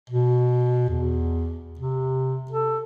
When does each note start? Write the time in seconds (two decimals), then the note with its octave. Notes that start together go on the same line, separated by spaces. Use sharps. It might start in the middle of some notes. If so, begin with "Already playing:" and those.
0.10 B2
0.89 E2
1.79 C3
2.51 A4